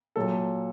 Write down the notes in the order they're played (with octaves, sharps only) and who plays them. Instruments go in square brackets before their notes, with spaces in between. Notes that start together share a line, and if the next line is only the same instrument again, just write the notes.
[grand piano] A#2 F#3 A4